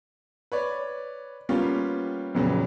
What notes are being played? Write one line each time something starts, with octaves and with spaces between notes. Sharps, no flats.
B4 C#5 D5
G3 A#3 B3 C#4 F4 G4
F2 A#2 C#3 F#3 B3